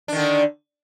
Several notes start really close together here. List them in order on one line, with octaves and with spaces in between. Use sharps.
D4 D#3 D3